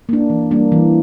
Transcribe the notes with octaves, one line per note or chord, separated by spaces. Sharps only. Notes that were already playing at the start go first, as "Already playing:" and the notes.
A#3 D4
E3
G3 A#3 D4
E3